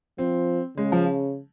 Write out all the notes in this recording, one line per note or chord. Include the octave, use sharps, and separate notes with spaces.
F3 C4
C#3 G#3
F3